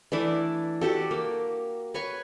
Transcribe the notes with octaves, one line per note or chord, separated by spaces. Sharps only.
E3 A3 D4 E4
F#4 G4 A4
A#3
B4 C#5 G#5 C#6